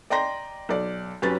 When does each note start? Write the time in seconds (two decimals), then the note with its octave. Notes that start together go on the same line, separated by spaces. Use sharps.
0.10 D5 D#5 G5 A#5 C6 A#6
0.69 B1 D5
1.22 F#2 C#4 G4 B4 A6